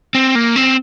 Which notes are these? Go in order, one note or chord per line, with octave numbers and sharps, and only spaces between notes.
C4
A#3
C4